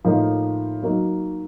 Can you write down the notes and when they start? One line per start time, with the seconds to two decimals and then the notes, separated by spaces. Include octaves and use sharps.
0.05 A2 F3 A#3 D#4
0.83 F#3 A#3 D#4